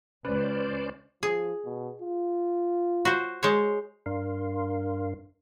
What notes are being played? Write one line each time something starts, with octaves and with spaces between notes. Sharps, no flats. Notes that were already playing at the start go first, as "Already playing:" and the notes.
C#2 C#4 B4 C5 D5
F3 G#4
B2
F4
F#4 C5
G#3 C5 C#5
G2 D4 A#4 F5 C6